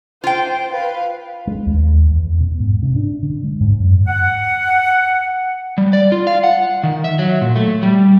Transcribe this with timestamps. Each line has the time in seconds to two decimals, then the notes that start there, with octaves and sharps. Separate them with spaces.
0.24 F4 C5 G5
0.73 B4 F5
1.47 G#3
1.66 D#2
2.11 E2
2.40 B2
2.60 G#2
2.83 C3
2.96 D4
3.22 D3
3.44 G#3
3.60 G#2
3.79 F#2
4.08 F#5
5.78 G3
5.93 D5
6.12 F4
6.27 F5
6.44 F#5
6.83 D#3
7.04 E5
7.19 F#3
7.41 A#2
7.56 A3
7.83 G3